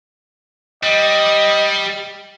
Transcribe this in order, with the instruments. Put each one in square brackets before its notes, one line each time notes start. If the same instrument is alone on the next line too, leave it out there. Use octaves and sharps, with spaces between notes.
[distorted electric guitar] G3 [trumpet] D#5